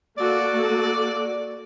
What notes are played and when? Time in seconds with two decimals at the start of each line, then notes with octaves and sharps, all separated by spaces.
0.18 A#3 F#4 A4 D5